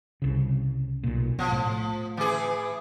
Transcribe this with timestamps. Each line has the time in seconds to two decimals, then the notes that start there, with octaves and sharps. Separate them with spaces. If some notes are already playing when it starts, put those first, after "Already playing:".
0.22 C2 C#3
1.03 B1 A#2
1.39 B2 F3
1.52 A2
2.17 E3 G#4